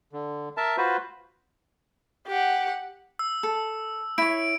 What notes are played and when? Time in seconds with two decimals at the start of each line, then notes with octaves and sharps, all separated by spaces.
0.13 D3
0.57 A#4 E5 A5
0.77 F4 F#4 B4 C5
2.28 G4 F#5
3.19 E6
3.43 A4
4.18 E4 C#5 D7